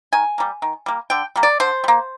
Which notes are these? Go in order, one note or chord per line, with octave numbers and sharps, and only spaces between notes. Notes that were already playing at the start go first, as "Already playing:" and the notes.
D#3 G#5
G3 A#3
D#3
G3 A#3
D3 G5
G3 A#3
D5
D3 C5
G3
A#3